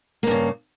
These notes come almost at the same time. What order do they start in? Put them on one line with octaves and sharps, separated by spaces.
A#3 G2 C#3